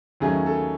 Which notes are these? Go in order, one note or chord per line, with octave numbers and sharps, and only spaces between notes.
D#2 D#3 F#3 A3 C#4 G#4
A4